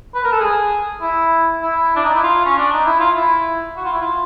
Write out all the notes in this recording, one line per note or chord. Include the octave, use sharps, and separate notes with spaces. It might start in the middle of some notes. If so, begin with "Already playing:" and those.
B4
A#4
A4
G#4
E4
E4
D4
D#4
E4
F4
C#4
D4
D#4
E4
F4
E4
F#4
F4
E4
F4